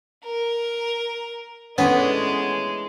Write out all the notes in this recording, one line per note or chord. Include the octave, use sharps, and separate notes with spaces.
A#4
E3 G#3 A3 B3 C#4 D4